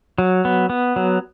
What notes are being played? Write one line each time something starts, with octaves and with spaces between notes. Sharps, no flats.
F#3
B3
B3
F#3